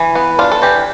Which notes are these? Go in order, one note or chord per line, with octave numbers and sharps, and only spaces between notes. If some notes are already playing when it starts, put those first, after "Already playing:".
Already playing: E3
B3
D4 F4
A4
E3 G4